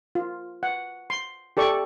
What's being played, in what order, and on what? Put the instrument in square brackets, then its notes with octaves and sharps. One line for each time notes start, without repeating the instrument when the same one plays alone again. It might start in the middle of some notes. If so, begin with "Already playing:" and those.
[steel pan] F4
F#5
C6
G4 A4 D5 C#6